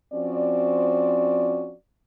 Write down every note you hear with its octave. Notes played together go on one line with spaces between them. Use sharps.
F3 C4 C#4 F#4 D5